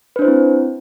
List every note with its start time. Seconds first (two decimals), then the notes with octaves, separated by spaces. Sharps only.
0.16 B4
0.19 D4
0.22 C5
0.25 E4
0.28 C4